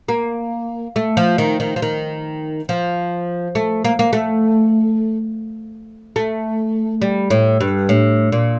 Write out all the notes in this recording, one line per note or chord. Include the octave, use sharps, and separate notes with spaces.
A#3
A3
F3
D#3
D#3
F3
D#3
F3
A3
A#3
A#3
A3
A3
G3
A2
G2
A2
A#2